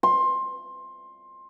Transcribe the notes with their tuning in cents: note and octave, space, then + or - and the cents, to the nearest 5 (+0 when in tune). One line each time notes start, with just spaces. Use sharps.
C6 +20